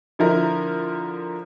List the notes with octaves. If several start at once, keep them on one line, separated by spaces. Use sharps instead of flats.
D3 F3 E4 A#4